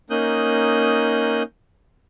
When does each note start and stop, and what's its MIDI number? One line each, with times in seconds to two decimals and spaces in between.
0.10 1.43 58
0.10 1.43 61
0.10 1.43 63
0.10 1.43 87
0.10 1.43 90
0.10 1.43 91